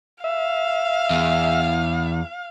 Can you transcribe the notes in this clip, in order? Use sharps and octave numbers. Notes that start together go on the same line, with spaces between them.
E5 F5
E2